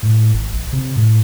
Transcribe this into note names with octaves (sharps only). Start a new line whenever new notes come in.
A2
G#1
A#1
C3
A2